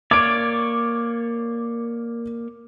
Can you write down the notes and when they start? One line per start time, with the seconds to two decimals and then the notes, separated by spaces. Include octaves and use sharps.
0.11 A#3 C#5 D5 D6 D7